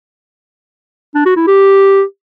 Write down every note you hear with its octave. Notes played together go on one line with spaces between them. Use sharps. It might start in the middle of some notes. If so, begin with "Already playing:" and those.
D4
F#4
E4
G4